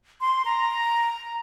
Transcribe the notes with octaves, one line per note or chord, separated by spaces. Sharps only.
C6
A#5